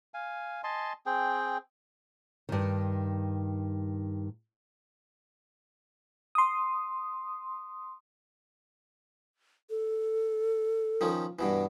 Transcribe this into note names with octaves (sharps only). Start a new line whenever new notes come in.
F5 G#5
D#5 G#5 A5 C6
C4 G#4 G5
G2 D#3
C6 D#6
A4
D#3 F3 C#4
G2 B2 E3